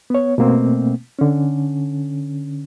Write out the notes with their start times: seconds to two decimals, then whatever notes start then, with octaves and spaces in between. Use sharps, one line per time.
0.10 B3 C#5
0.38 B2 A3 A#3 C4
1.19 D3 C#4